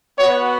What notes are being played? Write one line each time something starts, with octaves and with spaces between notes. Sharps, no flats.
B3 F#4 C#5